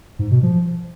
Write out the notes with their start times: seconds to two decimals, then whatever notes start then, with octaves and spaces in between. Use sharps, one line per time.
0.19 G#2
0.31 B2
0.43 F3